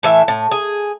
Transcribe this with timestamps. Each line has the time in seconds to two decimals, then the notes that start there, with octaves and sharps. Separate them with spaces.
0.03 A2 E3 E5
0.28 A2
0.51 G#4